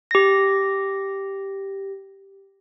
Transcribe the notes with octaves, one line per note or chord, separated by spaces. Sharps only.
G4 A#6